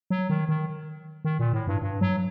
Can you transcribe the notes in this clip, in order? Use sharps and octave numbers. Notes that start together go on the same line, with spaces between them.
F#3
D#3
D#3
D#3
A#2
A2
G2
G2
F#3